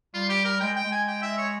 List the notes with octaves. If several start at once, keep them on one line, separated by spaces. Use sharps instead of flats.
G3 F4
G4
A#4
G#3 G5
G5
G#3
G#5
G5
E5
C#5